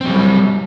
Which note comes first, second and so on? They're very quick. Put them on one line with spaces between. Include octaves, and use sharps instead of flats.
C4 F#3 G3